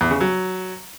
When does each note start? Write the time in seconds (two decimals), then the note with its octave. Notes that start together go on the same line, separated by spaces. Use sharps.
0.01 E2
0.11 C#3
0.21 F#3